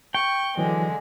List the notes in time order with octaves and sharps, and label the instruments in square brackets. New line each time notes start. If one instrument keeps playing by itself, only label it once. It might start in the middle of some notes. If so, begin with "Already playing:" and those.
[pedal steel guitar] G5 [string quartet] C#6
[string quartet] D3 G#3 [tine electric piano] E3 F#3